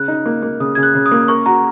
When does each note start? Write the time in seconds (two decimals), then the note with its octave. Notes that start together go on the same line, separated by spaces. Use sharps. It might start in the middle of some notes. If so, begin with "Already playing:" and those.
Already playing: C#3 F#6
0.08 D#4
0.25 A#3
0.42 A#3
0.60 C#3 D#6
0.75 C#3 G#6
0.83 F#6
0.94 C#3
1.06 D#6
1.11 A#3
1.28 A#4 C#6
1.46 F#4 A#5